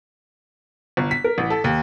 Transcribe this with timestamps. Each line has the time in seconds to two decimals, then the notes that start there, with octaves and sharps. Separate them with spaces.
0.97 G1
1.11 B6
1.24 A#4
1.38 A1
1.50 A4
1.64 D#2